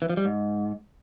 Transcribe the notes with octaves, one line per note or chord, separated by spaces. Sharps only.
E3
F3
G3
G#2